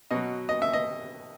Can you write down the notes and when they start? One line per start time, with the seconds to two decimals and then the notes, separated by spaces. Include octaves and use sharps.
0.11 B2 F#3 D#5
0.49 D#5
0.62 E5
0.73 D#5